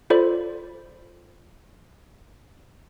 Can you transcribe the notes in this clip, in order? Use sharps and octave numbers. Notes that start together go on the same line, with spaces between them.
F4 A4 C5 D5 B5